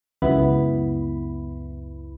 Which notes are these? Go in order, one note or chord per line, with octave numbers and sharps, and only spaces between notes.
C#2 F#2 B3 E4 B5